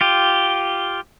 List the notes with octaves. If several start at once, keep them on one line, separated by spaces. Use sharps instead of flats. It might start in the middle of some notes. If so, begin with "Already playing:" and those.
F4 G4